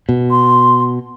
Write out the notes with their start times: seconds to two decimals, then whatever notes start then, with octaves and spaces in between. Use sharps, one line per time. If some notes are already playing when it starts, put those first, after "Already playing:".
0.09 B2
0.31 C6